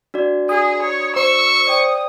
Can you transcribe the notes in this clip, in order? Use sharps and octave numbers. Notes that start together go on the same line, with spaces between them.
D4 F#4 D5
G#4 D#6
C#5
C5 C#6 E6
D5 G5 D#6